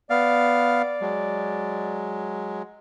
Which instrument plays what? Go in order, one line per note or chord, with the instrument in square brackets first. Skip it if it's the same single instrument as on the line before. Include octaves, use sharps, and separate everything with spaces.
[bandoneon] B3 F5 [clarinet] D5
[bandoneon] F#3 G#3